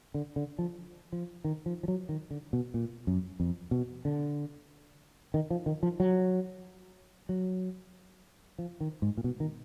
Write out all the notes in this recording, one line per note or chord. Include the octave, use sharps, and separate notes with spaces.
D3
D3
F3
F3
D#3
F3
F3
F#3
D#3
D3
B2
A#2
F#2
F2
B2
D3
D#3
F3
D#3
F3
F#3
F#3
F3
D#3
G#2
A#2
B2
D#3